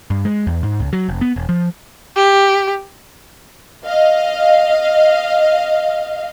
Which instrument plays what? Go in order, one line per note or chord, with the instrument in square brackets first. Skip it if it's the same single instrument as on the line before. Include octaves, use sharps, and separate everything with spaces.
[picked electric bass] G2
G#3
E2
G#2
C#2
F#3
F1
B3
E1
F3
[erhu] G4
[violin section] D#5 F5